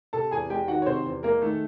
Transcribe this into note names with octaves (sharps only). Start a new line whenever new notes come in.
C3 A4 A5
E2 G#4 G#5
G#3 G4 G5
D#3 F#4 F#5
C#5
C3 C4 C5
E2
G#3 A#3 A#4
D#3 A3 A4